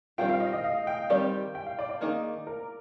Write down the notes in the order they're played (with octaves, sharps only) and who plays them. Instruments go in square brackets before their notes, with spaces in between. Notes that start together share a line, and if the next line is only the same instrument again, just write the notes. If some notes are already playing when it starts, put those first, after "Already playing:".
[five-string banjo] D#3 G3 C4 F4 [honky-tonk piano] G5
[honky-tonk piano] F5
D#5
D#5
F5
G5
[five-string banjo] D#3 G3 C4 G4 D5
[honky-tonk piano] G5
F5
D5
D5
[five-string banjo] D#3 A#3 D#4 G#4
[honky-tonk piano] A#4